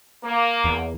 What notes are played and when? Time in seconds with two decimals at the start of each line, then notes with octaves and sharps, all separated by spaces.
0.24 A#3
0.64 E2